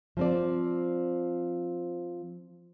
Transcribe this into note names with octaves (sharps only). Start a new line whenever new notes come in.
F3 C4 D5